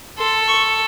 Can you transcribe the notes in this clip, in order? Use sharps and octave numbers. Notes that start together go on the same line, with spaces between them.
A4 C6
C#6